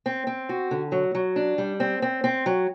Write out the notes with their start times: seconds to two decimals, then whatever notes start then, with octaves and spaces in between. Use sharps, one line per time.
0.06 C4
0.27 C4
0.49 F#4
0.71 D3
0.92 F#3
1.15 F#3
1.36 D4
1.58 G3
1.80 C4
2.02 C4
2.24 C4
2.46 F#3